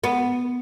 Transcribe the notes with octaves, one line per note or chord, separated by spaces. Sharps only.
B3